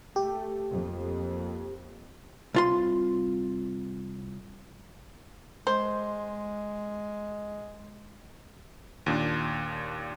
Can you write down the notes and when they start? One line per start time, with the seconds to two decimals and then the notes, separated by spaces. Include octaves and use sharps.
0.16 A3 G4
0.70 F2 A#3
2.54 C2 F4 C6
5.67 G#3 C5
9.06 D#2 A#2 D4